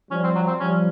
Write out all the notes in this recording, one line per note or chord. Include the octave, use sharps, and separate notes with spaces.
F3 G3 C#4
C4
F#3
C4
F3 G3 C#4